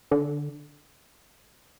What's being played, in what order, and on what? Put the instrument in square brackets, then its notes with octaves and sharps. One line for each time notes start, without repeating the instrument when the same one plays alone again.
[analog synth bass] D3